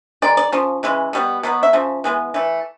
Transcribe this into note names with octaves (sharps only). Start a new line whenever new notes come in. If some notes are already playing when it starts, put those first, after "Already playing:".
D#3 G#3 D5
D5
C#3 F3
C#3 E3 G#3
B2 G3 B3
B2 F#3 B3
E5
C#3 F3
E3 G#3 B3
E3 A3